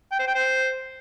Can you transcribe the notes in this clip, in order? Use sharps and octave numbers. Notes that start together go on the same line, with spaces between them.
G5
C5
G5
C5